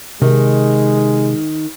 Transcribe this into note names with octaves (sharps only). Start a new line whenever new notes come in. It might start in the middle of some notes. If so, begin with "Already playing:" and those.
C3 D#3 G#3